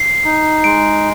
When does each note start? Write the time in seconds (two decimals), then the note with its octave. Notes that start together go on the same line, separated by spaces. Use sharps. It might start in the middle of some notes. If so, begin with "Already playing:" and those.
Already playing: C7
0.24 D#4
0.64 G#3 D7